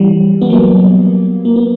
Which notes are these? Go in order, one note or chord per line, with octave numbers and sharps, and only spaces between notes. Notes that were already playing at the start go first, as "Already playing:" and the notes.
Already playing: E3 G3
B3
F#3 A#3
A#3
B3